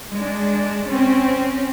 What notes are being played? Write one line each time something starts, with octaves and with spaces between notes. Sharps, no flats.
G#3 D4
C4 C#4